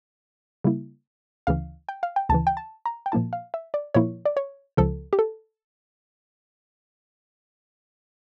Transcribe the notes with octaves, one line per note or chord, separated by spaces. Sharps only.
C#3 G3 A#3 E4
D2 C#3 E3 F5
G5
F5
G5
D2 C#3 E3 A5
G5
A5
A#5
G5
A#2 F3 A#3 E4 A5
F5
E5
D5
A#2 F3 A#3 E4 C#5
D5
C#5
C#2 C#3 F3 A4
G4
A4